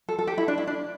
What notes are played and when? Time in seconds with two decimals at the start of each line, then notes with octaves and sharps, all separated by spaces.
0.09 A4
0.19 A4
0.27 G4
0.38 E4
0.48 D4
0.58 E4
0.67 D4